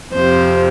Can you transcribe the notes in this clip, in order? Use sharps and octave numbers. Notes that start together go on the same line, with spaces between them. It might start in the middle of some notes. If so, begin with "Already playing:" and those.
F2 C3 F3 C5